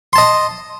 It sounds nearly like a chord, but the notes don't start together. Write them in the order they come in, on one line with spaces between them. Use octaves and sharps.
C6 A5 D#5